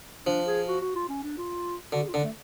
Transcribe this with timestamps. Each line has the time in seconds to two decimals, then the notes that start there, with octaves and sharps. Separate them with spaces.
0.27 F3 D4
0.47 G#4
0.68 F#4
0.81 F#4
0.95 F4
1.09 C#4
1.23 D4
1.38 F4
1.92 D3 F#4
2.03 G#4
2.08 F4
2.14 D3 D4
2.24 A3